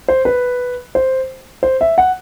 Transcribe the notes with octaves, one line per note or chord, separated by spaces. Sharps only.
C5
B4
C5
C5
E5
F#5